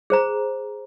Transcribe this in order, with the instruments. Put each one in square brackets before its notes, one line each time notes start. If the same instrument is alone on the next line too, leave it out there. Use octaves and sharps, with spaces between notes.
[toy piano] G#4 C5 A#5